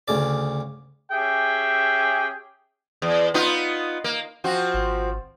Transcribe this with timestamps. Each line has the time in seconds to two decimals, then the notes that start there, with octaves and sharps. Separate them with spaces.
0.08 D2 C#3 D5
1.12 C#4 G4 G#4 E5 G5
3.02 E2
3.34 B3 D#4 F4
4.04 A#3
4.44 F3 C4 F#4
4.74 G#1